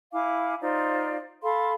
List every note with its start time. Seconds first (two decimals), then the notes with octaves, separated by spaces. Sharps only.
0.12 E4 F5 G#5 D6
0.61 D#4 F4 C5 D5
1.43 A4 F5 B5 C6